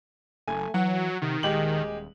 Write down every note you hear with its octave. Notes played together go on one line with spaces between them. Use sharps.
F#1 A3 G#5
E3 F#3 F#5
C3 D#3
D#1 G#3 G4 F#7